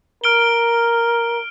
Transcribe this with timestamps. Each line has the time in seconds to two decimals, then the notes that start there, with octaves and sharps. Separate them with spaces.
0.24 A#4 F6 D7 G7